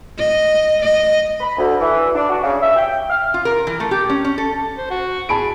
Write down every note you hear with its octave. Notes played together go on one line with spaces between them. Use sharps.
D#5
D#5
B5
D2
E3
D4
F#4
C#3
E5
G5
F6
F4
A#4
E3
A3
G4
C#4
C#4
A4
C5
F#4
G#4 A5 B5 D7